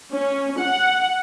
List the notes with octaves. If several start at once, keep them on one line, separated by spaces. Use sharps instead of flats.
C#4
F#5